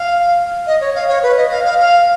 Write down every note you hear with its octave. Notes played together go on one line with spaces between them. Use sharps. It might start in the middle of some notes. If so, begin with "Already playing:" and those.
Already playing: F5
D#5
C#5
F5
C#5
B4
D#5
F5
F5
F5